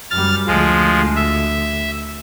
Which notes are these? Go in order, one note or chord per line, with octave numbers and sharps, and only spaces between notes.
F#2 G3 F6 A6
D2 F3 G#3
E5